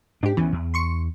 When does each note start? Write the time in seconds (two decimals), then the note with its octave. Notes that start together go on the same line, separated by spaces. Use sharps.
0.23 G#2 D4 G4
0.37 D2 E3 B3 C#4
0.53 E2
0.74 C6 C#6 C#7